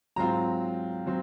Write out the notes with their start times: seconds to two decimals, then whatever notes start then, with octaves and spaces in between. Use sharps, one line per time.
0.16 G#2 F#3 C4 F4 A#5
1.07 F#3 C4